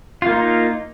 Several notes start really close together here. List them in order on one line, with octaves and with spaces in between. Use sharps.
F4 A#3 D#4